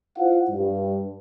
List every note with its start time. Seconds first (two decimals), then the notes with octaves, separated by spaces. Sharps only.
0.18 E4 F4 C5 F5 F#5
0.50 G2